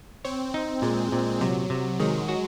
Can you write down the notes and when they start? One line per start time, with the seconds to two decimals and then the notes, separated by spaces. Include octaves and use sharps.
0.25 C4 C#5
0.54 D#4
0.82 A#2 G#3
1.12 A#2
1.41 C3 F#3
1.70 C3
2.00 D#3 G#3
2.29 F#4